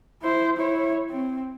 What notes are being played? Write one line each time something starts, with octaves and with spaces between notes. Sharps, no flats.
E4 C5
E4 C#5
C4